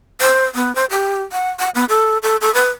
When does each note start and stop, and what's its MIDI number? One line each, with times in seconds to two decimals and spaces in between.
0.21 0.44 72
0.55 0.74 59
0.75 0.85 72
0.91 1.22 67
1.32 1.50 78
1.60 1.70 78
1.75 1.85 59
1.89 2.18 69
2.23 2.37 69
2.41 2.53 69
2.54 2.69 71